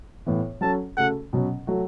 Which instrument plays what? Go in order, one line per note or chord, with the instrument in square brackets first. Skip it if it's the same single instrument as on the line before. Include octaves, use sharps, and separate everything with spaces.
[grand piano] A2 E3 B3
[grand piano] F#3 C#4 F#4 A4 [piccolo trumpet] A5
[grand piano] C#3 A3 F#4 A4 [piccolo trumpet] F#5
[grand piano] B2 F#3 C#4
F#3 A3 F#4